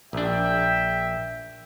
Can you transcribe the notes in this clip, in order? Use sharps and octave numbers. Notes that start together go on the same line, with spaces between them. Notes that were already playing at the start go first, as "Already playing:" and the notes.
A#1 D4 E5 G5